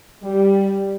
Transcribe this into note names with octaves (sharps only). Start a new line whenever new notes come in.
G3